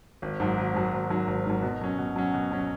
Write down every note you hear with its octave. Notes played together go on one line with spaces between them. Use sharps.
G#1
G#2 F#3
G#1
G#2 F#3
G#1
G#2 F#3
G#1
G#2 F#3
B2
F#3 C#4
B2
F#3 C#4
B2
F#3 C#4